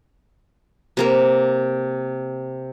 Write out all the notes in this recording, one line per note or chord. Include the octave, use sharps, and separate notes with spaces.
C3 A#3 A#4